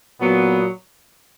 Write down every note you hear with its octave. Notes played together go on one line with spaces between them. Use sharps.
A#2 F#3 B3